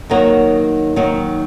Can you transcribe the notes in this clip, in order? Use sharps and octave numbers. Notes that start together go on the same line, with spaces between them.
D#3 F#3 A#3 D#4 F#4
D#3 F#3 A#3 D#4 F#4